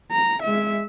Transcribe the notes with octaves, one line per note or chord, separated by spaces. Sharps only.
A#5
G#3 E5